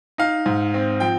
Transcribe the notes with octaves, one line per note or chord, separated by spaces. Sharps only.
D#4 F5
G#2
C4
F3 G5